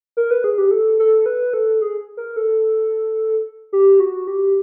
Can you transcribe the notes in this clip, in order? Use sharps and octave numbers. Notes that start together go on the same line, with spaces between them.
A#4
B4
G#4
G4
A4
A4
B4
A4
G#4
A#4
A4
G4
F#4
G4